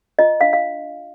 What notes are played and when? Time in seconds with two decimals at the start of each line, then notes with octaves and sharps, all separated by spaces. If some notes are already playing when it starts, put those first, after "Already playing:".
0.19 F4 D#5
0.41 D4 F5
0.53 F5